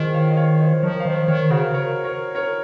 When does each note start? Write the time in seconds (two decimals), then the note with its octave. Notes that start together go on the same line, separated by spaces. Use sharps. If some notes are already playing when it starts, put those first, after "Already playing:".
Already playing: D#3 F4 G#4 C5 D#5
0.14 C#5 F5
0.31 D#5
0.37 C#5 F5
0.60 C5 D#5
0.82 F3 A#4 C#5
1.00 F5
1.05 D#3 C5 D#5
1.28 D#3 A#4 C#5
1.51 C#3 F#4 A#4
1.74 A#4 C#5
2.04 A#4 C#5
2.35 A#4 C#5